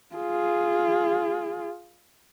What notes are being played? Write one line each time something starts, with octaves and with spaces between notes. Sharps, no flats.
F4 G#4